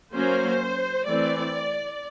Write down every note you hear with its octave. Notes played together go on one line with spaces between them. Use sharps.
F#3 A#3 C#4 C5
E3 A3 C4 D5